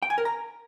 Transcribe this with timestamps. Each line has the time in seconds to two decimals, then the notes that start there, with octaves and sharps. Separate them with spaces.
0.02 G5
0.10 G#5
0.18 A#4
0.25 A#5